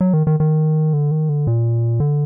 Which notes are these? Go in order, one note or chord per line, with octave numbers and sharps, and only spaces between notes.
F#3
D#3
D#3
D#3
D3
D#3
D3
A#2
D3